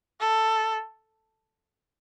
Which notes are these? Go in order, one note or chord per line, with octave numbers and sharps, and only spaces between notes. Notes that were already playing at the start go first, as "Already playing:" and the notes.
A4